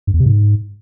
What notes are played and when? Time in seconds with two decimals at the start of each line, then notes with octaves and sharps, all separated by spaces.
0.07 G2
0.14 E2
0.20 C3
0.26 G#2